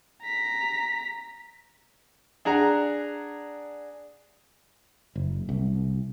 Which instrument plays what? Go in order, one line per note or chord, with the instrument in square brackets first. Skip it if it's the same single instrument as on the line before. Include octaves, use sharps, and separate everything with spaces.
[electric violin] A#5 B6
[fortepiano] D4 G#4 F#5 A#5
[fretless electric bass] F#1
C2